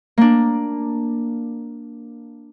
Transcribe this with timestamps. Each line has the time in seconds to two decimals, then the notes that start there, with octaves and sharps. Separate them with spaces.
0.18 A#3 D4